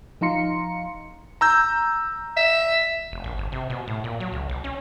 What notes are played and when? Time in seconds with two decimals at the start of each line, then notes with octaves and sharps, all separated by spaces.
0.21 F3 D#4 F5 A#5 C6 C#7
1.41 A#5 E6 G6
2.37 E5
3.12 F1
3.24 A#1
3.38 G1
3.52 C3
3.70 B2
3.88 A2
4.04 A#2
4.20 F#3
4.33 C#2
4.49 B1
4.64 C#4